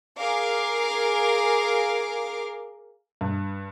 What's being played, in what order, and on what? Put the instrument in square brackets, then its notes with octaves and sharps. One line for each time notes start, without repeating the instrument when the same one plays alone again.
[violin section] G#4 A#4 F5 D6
[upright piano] G2